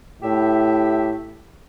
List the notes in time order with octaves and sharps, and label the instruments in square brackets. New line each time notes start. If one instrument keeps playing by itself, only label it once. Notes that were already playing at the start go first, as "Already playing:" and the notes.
[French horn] A2 [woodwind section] G4 E5